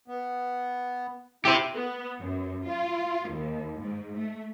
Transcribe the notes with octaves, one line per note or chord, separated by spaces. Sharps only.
B3
E4 G4 C5 E5
B3
F#2
F4
D#2
G#2
A3